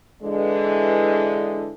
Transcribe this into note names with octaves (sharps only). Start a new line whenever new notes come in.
D3 E3 G#3